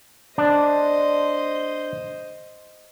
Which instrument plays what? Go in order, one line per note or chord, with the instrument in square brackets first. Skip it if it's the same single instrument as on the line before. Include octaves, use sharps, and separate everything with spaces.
[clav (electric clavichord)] D4 [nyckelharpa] C5 D#5